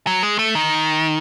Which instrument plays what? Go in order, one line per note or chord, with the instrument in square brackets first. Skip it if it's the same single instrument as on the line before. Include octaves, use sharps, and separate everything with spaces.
[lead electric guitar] F#3
G#3
A3
D#3